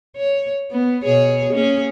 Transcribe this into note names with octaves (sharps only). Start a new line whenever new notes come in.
C#5
B3
B2 G#4 C#5
A#3 C#4 G#4